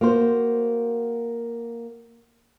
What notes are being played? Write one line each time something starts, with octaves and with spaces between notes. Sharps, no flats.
A#3 F#4 C5